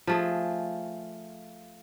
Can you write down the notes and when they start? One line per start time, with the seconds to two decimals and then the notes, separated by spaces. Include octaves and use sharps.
0.07 F3 A3 G#4